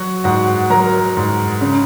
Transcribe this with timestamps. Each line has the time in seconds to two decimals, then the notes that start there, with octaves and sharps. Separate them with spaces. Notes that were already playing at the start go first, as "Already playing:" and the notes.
Already playing: F#3 F#4 F#5
0.24 G#2 F#4 F#5
0.70 F#3 A#4 A#5
1.17 G#2
1.61 C#3